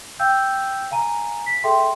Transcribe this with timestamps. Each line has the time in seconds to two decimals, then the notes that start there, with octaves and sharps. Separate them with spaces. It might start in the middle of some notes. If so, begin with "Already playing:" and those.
0.19 F5 G5 E6 G6
0.91 F5 G#5 A#5 D#7
1.46 B6
1.64 G#4 A4 E5 G5 C6